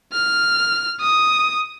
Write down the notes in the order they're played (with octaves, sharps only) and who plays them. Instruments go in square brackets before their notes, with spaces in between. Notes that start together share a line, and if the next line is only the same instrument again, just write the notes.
[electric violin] F6
D#6